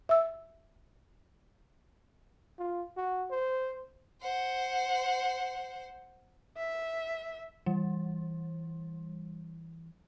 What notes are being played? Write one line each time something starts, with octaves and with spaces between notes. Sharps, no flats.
E5 E6
F4
F#4
C5
C5 F#5
E5
E3 G3